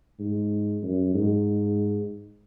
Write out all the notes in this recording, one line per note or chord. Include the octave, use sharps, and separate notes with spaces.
G#2
F#2
G#2